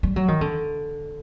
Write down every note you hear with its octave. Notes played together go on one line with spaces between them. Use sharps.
G3
F#3
D#3
D3